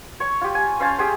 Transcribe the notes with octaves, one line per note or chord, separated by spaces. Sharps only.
C#5 C#6
F4 G4
G#5
C#4 C5 F5 A5
G4 G#4 C5